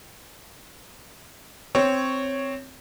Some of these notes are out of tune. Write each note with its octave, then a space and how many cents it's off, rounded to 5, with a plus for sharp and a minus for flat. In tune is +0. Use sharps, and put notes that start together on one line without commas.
C4 +0 C#5 +0